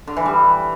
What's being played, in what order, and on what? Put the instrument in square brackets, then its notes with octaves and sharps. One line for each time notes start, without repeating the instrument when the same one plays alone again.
[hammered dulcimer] D3
E3
G3